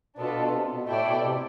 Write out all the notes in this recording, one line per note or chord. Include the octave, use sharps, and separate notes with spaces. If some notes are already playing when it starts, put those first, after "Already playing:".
B2 B3 D4 F4 A4
B2
C3
B2
A2 A3 E4 A4 D5 G5
B2
C3